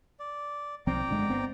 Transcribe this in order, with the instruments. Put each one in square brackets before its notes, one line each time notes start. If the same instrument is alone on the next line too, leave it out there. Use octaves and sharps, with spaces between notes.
[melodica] D5
[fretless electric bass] B1 F3 C4 [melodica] D5 G5 A#5
[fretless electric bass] G1 D3 G#3
G1 B3 C4